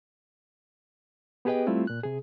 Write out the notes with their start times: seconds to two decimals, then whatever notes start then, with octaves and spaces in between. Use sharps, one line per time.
1.45 B3 G4 G#4 B4 D#5 G5
1.67 G3 A3 C4 E4 F4
1.87 A#2 F#6
2.03 C3 G#4